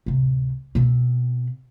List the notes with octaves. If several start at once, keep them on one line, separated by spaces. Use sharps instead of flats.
D1 C3
B2 C4